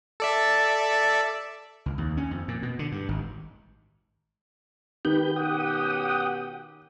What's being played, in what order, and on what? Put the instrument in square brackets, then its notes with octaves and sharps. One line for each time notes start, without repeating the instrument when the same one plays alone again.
[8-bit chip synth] A4 D5 E5
[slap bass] C#2
D#2
C#4
F2
A#2
B2
D3
G2
G#1
[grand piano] D#3 [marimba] D#4 [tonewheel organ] G4 B4 G6
[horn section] B2 C#4 G4 [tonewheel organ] F#5 G5 D#6